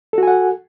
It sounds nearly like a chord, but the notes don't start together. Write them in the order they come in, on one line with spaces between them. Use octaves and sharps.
A4 F#4 G#5 F#5